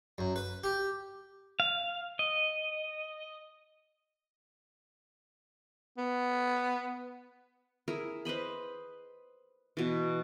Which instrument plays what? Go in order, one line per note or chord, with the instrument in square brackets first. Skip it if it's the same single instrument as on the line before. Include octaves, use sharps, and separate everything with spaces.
[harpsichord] F#2
B4
G4
[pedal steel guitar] F5
D#5
[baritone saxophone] B3
[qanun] E4 G#4 A#4 E5
B4 C5 D#5 B5
B2 E3